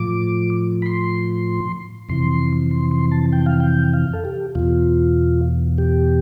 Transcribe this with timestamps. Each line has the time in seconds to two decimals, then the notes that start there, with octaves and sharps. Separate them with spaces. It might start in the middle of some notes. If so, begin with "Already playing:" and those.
Already playing: A2 F3 D6
0.82 B5
0.86 C6
2.09 F2 C3 E3 C6
2.71 C6
2.91 C6
3.12 A5
3.33 G5
3.46 F5
3.60 G5
3.93 F5
4.13 A4
4.25 G4
4.55 E2 B2 F4
5.78 G4